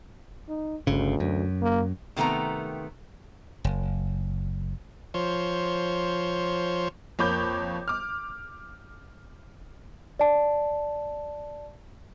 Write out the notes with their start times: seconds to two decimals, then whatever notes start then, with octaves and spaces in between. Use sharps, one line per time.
0.49 D#4
0.87 G1 D2 C#3
1.20 F#2
1.62 A#3
2.16 C3 D#3 A3 B3 A#5
3.64 F#1
5.14 F3 C5 C#5
7.19 F2 A#3 C#5 B5 D6 G6
7.88 D6 F6
10.20 D5 A5